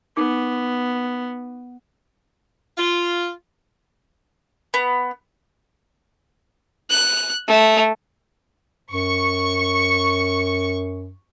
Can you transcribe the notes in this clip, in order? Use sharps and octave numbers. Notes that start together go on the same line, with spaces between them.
B3 D#4 D6
F4
B3
F#6
A3
F#2 C#6